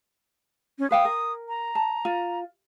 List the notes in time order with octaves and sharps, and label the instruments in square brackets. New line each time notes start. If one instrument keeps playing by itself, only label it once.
[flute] C#4
[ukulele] B4 F5 G5 [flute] D#6
[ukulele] A#4
[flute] A#5
[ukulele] A5
F4